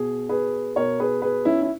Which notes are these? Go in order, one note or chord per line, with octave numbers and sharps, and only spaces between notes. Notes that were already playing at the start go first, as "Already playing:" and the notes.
Already playing: B2 G#4
G#4 B4
B2 A#4 C#5
G#4 B4
G#4 B4
C#4 E4
E4